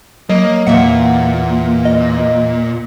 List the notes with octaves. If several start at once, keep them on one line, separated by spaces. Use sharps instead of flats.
F#3 A#3 D#5
E2 A#2 A#3 E5 F#5
D#5